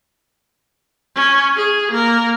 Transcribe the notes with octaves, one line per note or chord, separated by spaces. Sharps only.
C#4
G#4
A#3 A#4